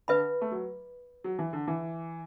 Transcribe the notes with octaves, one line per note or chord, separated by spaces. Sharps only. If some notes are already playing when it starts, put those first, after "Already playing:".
D3 B4 E5 B5
A3
F#3
F#3
E3
D3
E3